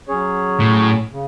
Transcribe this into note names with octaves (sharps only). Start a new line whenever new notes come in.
F#3 C#4 G#4 C#5
A2
C#3